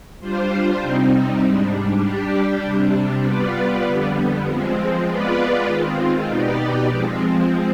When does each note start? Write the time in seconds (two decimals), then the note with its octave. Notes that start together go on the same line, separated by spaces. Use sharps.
0.20 G3 D4 F4 C5
0.81 C3 G3 C4 D#4
1.42 G#2 G3 D4
2.02 G3 D4 G4
2.63 C3 G3 D4
3.24 G3 B3 F4 B4 D5
3.85 F2 D3 G3 B3
4.45 F3 G#3 C4
5.06 G#3 B3 F4 B4 D5
5.66 D#3 G#3 C4 F4
6.27 B2 B3 D#4 G4 D5
6.87 F3 G#3 C4